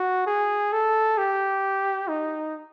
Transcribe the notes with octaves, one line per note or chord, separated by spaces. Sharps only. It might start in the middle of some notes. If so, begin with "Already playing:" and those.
Already playing: F#4
G#4
A4
G4
D#4